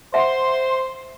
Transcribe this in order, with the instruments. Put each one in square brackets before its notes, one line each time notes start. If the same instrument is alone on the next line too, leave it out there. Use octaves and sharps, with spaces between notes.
[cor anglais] C5 [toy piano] E5 F#5 [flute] C6